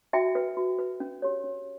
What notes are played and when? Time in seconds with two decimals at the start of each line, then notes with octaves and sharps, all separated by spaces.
0.13 F#4 E5 G5
0.35 B4
0.57 F#4
0.79 B4
1.00 C#4
1.22 G4 C#5
1.44 C#4